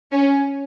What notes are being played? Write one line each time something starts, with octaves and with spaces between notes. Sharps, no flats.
C#4